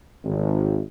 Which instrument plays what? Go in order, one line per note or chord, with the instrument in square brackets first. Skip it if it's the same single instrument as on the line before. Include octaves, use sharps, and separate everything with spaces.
[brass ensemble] G#1